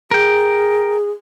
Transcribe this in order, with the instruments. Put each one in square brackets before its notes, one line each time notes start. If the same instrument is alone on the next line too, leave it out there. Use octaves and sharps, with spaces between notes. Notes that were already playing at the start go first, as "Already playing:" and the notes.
[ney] G#4 [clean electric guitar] A#4 G5